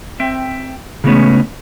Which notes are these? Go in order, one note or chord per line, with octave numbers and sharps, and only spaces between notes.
C4 E5 G5
C#3 E3 G#3 A3 B3 C#4